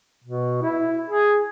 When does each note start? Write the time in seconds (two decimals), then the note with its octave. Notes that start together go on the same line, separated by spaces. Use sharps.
0.24 B2
0.62 E4
1.09 G#4